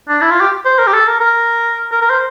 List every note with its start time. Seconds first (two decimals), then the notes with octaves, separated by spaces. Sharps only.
0.09 D4
0.22 E4
0.31 F4
0.41 G4
0.65 C5
0.79 A#4
0.87 G4
0.93 A4
1.07 A#4
1.21 A#4
1.91 A#4
2.01 A#4
2.10 C5